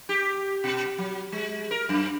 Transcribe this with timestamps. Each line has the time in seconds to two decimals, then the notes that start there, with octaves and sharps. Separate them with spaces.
0.09 G4
0.64 B2
0.98 F#3
1.32 G#3
1.71 A#4
1.89 F#2